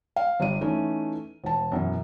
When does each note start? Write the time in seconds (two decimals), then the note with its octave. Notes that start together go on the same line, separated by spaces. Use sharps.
0.16 F5
0.40 G1 G3 D#7
0.61 E3 A3 C#4 D#4
1.44 E1 A5
1.72 F#2 B2 E3